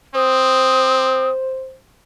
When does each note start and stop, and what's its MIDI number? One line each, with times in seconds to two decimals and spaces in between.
0.15 1.32 60
0.15 1.74 72
0.15 1.30 87